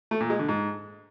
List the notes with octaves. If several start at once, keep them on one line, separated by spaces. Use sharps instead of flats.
A3
A#2
G#3
D3
G#2